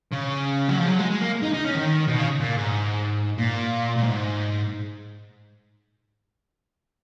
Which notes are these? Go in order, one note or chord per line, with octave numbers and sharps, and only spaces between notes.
C#3
F#3
F3
F#3
G#3
G#3
A#3
D#4
D#4
C#4
D#3
B2
C#3
A#2
G#2
A#2
A#2
G#2